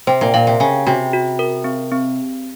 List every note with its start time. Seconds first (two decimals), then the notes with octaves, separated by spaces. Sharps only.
0.07 C3 C5
0.21 A#2
0.34 A#2 F5
0.47 C3
0.60 C#3 G#5
0.87 C3 F#4
1.13 F#4
1.39 A#4
1.64 C4
1.92 C4